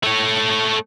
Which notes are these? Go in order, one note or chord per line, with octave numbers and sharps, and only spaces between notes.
A3 C#5